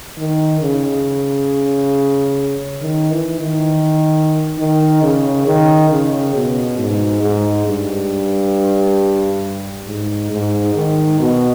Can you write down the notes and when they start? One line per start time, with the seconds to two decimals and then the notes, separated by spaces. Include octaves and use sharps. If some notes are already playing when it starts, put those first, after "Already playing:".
0.18 D#3
0.61 C#3
2.82 D#3
3.11 E3
3.40 D#3
4.58 D#3
5.02 C#3
5.46 D#3
5.90 C#3
6.35 B2
6.78 G#2
7.23 G#2
7.67 G2
9.87 G#2
10.31 G#2
10.75 D#3
11.19 B2